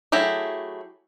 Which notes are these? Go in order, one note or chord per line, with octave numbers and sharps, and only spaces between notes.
F#3 A3 E4 G4 G#4